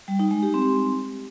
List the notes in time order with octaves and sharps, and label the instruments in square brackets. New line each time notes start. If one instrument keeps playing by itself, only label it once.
[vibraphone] G3
D#4
G#3
G4
C4